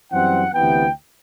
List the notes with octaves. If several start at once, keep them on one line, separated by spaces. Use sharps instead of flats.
F#2 E3 G3 C4 F#5
D2 C3 E3 B3 G5